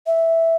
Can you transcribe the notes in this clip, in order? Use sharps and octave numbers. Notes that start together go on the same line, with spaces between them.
E5